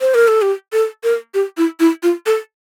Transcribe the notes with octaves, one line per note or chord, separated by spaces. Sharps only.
C5
A#4
A4
G4
A4
A#4
G4
E4
E4
F4
A4